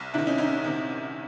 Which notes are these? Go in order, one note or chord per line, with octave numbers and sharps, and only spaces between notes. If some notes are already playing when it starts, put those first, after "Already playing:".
Already playing: C2
C3 D#3 D4 E4
C#4 D#4
C2 C#4 D#4
C3 D#3